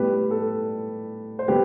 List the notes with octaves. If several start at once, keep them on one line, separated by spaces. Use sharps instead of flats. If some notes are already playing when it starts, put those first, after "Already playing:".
Already playing: A2 G3 B3 G4 B4
A4
C5
G3 B3 G4 B4